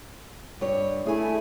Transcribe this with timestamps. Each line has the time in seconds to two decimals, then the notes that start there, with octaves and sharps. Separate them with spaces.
0.61 G2 C#5
1.06 A3 E4 G#4 G#5